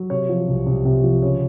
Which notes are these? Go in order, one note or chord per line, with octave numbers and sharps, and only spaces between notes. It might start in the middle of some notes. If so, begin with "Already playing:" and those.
Already playing: F#3
C3 C#5
F3
C2
C2
C3
F3
C#3 C#5